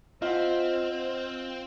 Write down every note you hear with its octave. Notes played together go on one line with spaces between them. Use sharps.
C4 F4 C5 D#5 F#5